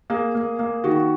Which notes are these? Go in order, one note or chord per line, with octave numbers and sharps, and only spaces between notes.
A#3 G#4
A#3
A#3
D#3 F#4